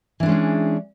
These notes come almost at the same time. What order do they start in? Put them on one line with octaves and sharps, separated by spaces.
E3 D4 G#3 C#4 G#4